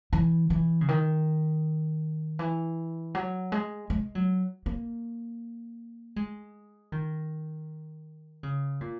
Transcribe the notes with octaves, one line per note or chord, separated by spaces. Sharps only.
E3
E3
C#3
D#3
E3
F#3
G#3
G#3
F#3
A#3
G#3
D#3
C#3
A#2